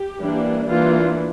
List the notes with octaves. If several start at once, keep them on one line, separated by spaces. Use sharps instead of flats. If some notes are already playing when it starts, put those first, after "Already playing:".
Already playing: G4
E3 G3 A#3 D4
E3 A#3 D4 F4